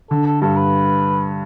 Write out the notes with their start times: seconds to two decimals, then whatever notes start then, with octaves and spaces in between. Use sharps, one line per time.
0.10 D3 A4
0.26 A4
0.42 G2 A4
0.57 B4